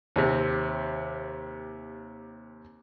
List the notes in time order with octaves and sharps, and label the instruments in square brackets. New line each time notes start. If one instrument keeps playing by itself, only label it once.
[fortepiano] D#2 C3